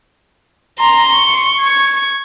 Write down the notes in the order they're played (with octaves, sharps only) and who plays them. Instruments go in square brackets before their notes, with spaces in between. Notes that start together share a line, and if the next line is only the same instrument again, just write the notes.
[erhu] A#5 [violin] C6
[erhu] C#6
[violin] G#6